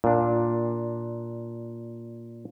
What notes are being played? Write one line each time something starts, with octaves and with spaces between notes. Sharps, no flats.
A#2 D4